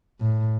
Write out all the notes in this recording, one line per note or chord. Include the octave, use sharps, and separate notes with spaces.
A2